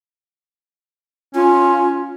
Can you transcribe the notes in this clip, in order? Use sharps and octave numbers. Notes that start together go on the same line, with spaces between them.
C#4 F4